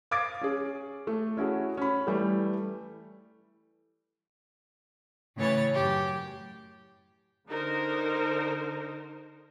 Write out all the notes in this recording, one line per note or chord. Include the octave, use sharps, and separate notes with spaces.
F5 D6 D#6 G#6 A6 D7
C#4 G#4
A3
C#4 E4 F#4 G#4
C#4 B5
E3 G3 A3
A2 C#3 E3 C#5 A6
F#2 G4
D3 D#4 A#4 C5